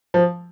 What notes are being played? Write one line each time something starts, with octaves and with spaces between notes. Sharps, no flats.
F3